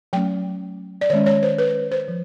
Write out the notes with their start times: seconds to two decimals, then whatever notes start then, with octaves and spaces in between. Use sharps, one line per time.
0.13 F#3 A3 C#4 G5
1.01 D5
1.10 D#3 C#5
1.13 G#3 C#4
1.26 C#5
1.43 C5
1.59 B4
1.92 C5
2.08 F3